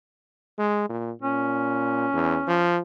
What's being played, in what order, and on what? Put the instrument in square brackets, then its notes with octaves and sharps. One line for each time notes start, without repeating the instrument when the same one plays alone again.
[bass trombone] G#3
A#2
[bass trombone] A#2 [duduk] C#4
[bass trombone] E2
F3